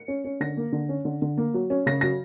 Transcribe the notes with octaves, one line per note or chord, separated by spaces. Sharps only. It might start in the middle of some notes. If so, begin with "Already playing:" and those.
Already playing: C#7
C#4
C#4
D3 A#6
A#3
D3
C#4
D3
D3
A#3
F#3
C#4
C#3 A#6
F#3 A#6